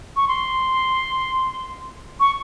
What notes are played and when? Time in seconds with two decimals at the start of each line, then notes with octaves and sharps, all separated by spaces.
0.16 C#6
0.28 C6
2.20 C#6